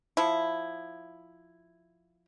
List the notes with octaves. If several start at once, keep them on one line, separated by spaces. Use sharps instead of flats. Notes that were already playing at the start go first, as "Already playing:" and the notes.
F3 E4